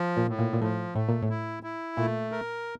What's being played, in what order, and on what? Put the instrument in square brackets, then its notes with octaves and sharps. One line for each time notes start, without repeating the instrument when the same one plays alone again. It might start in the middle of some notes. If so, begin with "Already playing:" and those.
Already playing: [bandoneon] F3
[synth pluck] A#2
[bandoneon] A2
[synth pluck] A#2
A#2
[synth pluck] A2 [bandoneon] F3
[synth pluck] A2 [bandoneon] A3
[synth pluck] A#2
A2
[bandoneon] E4
E4
[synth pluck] A#2 [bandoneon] A3
[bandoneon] A#4